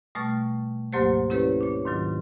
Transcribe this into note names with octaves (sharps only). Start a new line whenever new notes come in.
B2 G3 A3 C#6 F6 A6
D2 G#2 F#3 A#3 G4 C5
C#4 E4 G4 A4 B4 C#5
D4 C#5
G#2 D#3 F#3 F4